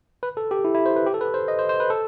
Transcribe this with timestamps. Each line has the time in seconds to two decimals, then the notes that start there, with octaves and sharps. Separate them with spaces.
0.23 B4
0.37 A4
0.51 G4
0.65 E4
0.75 E4
0.86 C5
0.96 B4
1.07 G4
1.14 A4
1.21 B4
1.34 C5
1.48 D#5
1.59 C5
1.69 C5
1.80 B4
1.90 A4